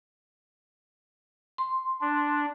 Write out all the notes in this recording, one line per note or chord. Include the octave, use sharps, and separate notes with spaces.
C6
D4